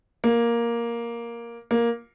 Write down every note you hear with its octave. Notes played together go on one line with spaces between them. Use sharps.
A#3
A#3